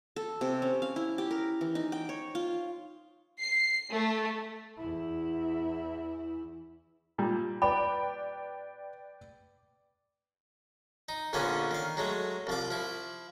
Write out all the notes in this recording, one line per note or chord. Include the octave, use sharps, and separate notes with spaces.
A4
C3
C#4
F5
E4
G4
A#4
E3
D#4
G5
C#5
F4
C7
A3
E2 E4
A#2 G3
B4 D5 G5 B5
D#4
A#1 A#2 D3 B3 C#4 C#5
D#3 F5
F#3 G#3 A3
C2 F3 D6
F3 E4